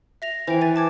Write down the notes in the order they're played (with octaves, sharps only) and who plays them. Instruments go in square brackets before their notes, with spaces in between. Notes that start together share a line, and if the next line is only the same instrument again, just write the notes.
[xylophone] E5 A#6 F7
[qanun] E3 [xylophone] C5 E5 G5
[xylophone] B4 G#5 A6
A5 D6 G#6